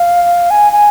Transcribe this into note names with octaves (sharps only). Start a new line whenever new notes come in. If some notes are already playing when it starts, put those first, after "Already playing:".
Already playing: F5
G#5
G#5